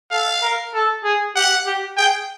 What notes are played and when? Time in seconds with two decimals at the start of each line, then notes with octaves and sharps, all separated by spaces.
0.11 A4 F5
0.42 A#4
0.74 A4
1.04 G#4
1.36 G4 F#5
1.66 G4
1.97 G#4 G5